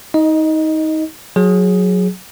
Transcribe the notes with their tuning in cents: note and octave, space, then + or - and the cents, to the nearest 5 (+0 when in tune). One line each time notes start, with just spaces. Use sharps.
D#4 +25 D#5 +0
F#3 -15 G#4 +0